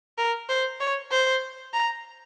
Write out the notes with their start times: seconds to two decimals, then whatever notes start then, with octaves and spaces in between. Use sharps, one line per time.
0.18 A#4
0.49 C5
0.80 C#5
1.11 C5
1.73 A#5